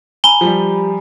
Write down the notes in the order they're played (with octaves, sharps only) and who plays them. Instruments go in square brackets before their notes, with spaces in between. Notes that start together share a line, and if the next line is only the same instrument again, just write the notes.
[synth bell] G#5 A#5 B5 [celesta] G7
[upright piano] F3 G3 [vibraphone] G4